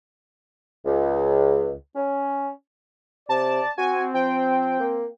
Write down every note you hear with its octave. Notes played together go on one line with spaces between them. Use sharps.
C#2
C#4
C3 D5 A5
C4 F#4 G#5
F3 G5
A#3